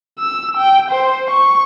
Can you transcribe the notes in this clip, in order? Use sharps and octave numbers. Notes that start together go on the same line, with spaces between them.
E6
G5
C5
C#6